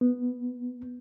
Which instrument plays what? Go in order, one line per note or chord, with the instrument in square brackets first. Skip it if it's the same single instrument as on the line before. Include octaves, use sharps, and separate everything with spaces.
[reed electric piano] B3